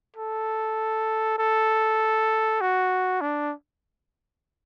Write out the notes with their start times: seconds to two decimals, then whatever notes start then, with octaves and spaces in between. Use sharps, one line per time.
0.16 A4
1.38 A4
2.61 F#4
3.21 D4